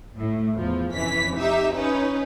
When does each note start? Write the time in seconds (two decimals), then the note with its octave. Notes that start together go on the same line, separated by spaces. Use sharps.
0.17 A2
0.56 E2 F3
0.94 F2 C3 E3 C#4 B6
1.35 D#4 G4 E5
1.75 C#4 D#4 B4